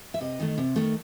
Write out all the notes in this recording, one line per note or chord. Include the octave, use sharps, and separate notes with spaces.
E5
C3 D#5
D#3 A3
C3
D#3 A3